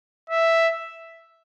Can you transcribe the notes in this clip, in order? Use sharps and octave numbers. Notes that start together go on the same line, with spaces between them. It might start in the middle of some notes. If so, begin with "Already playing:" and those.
E5